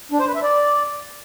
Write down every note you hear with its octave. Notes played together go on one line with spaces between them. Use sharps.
D4
C5
B4
E5
D5